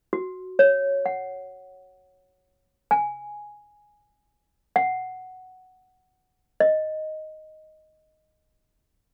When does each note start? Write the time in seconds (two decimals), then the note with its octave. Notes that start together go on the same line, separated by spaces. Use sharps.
0.13 F#4
0.59 C#5
1.06 F#5
2.91 G#5
4.76 F#5
6.60 D#5